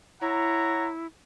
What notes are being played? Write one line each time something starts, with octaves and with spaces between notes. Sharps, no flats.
E4 C#5 F#5 A#5